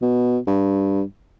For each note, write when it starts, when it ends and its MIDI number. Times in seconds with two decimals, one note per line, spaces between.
0.02 0.38 47
0.47 1.03 43